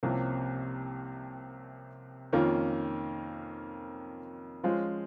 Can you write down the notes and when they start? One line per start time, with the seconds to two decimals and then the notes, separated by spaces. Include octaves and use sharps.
0.03 C2 C3 F3 A#3 C#4
2.33 F2 D#3 A#3 C#4 F4
4.63 F3 G#3 C#4 F4 C5